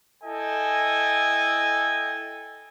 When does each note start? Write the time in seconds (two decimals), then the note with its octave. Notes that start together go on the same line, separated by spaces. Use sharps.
0.24 E4 A4 D#5 G5 G#5